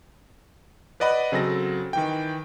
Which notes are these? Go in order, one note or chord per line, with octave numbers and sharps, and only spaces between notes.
B4 D5 D#5 F#5 B5
C#3 F#3 C4 A4 A#6
D#3 E3 G5